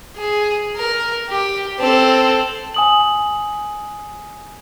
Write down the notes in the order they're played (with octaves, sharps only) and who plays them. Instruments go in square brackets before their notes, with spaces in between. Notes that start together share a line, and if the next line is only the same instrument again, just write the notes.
[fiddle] G#4
A#4
G4
C4 A4
[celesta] G#5 D#6 F#7